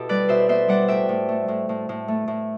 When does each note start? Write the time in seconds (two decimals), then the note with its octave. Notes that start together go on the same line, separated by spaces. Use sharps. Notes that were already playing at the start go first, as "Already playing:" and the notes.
Already playing: B2 E4 G4 A4
0.09 G3 B4 D5
0.29 B2 C5 E5
0.49 B3 C5 E5
0.68 G3 D5 F#5
0.88 A2 E5 G5
1.09 A2
1.29 A3
1.48 A2
1.69 A2
1.89 A2
2.08 A3
2.28 A2